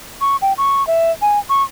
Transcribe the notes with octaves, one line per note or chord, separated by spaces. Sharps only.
C#6
G5
C#6
E5
G#5
C#6